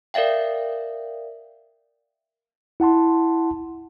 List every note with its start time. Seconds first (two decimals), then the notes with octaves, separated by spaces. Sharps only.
0.14 A#4 D5 E5 F5 G5
2.80 E4 F#5 A5 C6